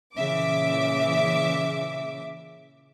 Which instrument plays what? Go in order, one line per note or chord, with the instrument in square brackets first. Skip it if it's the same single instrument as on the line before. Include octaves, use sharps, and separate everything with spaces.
[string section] A#2 C#3 E3 E5 D6